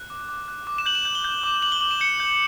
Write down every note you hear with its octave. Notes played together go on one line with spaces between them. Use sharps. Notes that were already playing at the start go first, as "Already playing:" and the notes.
Already playing: F#6
D6
D6
F#6
D6
E7
G6 F#7
E7
G6 F#7
G7
G6
D6
D6 F#7
G7
D6 F#7
E7
G6 C#7
G6